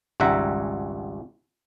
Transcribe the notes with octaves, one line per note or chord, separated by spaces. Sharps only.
G#1 C#2 G3 E5 F#5 A#5